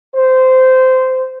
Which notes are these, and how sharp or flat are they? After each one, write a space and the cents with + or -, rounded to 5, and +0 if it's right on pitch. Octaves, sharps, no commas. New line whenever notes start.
C5 -15